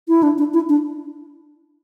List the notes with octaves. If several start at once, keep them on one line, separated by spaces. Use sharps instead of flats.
E4
D4
D4
E4
D4